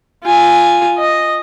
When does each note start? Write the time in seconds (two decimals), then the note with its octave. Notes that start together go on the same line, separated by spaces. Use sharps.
0.24 F4 G#5
0.98 D#5